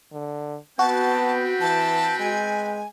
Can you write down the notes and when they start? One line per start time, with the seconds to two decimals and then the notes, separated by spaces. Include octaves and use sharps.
0.12 D3
0.79 B3 C4 F#4 B4 G5 A5
1.61 E3 A5
2.20 G#3 G#5